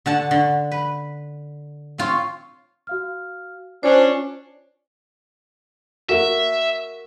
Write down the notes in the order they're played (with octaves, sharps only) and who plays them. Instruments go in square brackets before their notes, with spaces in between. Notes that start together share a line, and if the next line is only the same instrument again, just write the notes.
[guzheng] D3 F#5 A5
D3
B4
C4 F4 C#5
[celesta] F#4 F5 F6
[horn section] C#4 D4 [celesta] F4 G#5 [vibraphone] C5
[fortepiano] A#3 F#4 [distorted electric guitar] E5